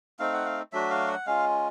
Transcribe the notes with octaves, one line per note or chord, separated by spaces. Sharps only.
A3 C4 D#4 F5
F#5
F5
F#3 A3 D4 F#4 E5
F5
F#5
G#3 C#4 F4 F5